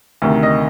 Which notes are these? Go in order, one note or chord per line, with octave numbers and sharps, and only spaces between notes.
D2 C3 D#3
D#5